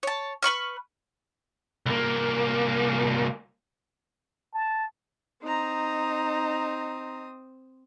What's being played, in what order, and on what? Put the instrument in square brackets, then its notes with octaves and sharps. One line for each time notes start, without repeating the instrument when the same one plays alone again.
[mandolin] C#5 A5
B4 B5 C#6 F6
[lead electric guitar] C2 A#3
[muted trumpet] A5
[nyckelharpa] C4 D#6 [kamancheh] D#4 A#5